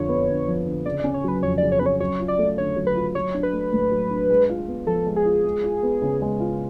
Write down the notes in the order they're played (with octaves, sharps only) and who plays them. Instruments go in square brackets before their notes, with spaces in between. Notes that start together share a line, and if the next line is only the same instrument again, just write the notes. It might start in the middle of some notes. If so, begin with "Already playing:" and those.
Already playing: [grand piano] F2 D3 F3 [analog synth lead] C#5
[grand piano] B3
D3
F3
D3
[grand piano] C#3 [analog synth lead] D5
[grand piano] C#4 [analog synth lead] D5
[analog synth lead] C#5
[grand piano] F#3 [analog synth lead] B4
[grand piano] F2 [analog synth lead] C#5
[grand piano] C#3 [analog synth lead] D5
[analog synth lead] C#5
[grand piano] C#4 [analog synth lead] B4
[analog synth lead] C#5
[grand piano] F#3 [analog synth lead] C#5
[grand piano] F4
[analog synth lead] D5
[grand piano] A3
[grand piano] D3 [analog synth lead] C#5
[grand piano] F#3
[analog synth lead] B4
[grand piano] F4
[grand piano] F#3 [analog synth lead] C#5
[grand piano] D4
[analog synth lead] B4
[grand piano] A3
A2
F#3
D4
G#3
F4
B3
[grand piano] F3 [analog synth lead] A4
[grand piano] G#3
[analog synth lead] G#4
[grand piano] F4
G#3
F4
B3
C#3
G#3
F4